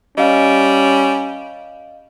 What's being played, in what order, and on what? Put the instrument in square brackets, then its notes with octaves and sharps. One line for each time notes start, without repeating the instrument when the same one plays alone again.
[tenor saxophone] G3 [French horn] C#4 [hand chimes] D#5 F5